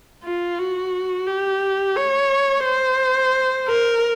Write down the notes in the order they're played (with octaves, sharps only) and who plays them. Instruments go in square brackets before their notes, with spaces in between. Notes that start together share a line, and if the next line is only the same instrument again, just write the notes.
[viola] F4
F#4
G4
C#5
C5
A#4